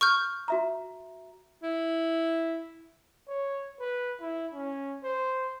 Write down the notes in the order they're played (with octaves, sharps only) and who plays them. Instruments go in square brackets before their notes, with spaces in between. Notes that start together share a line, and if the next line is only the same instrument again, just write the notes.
[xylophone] C#6 F6 G6
[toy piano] F#4 E5 A#5
[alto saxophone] E4
[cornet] C#5
B4
E4
C#4
C5